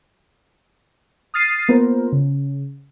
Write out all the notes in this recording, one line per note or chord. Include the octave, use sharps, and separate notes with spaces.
D#6 F6 A6 C7 D#7
A#3 B3 F4 A#4 C5
C#3